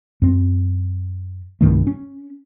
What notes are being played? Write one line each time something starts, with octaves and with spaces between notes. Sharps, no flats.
F#2 C4
C2 G2 D#3 A3
C#4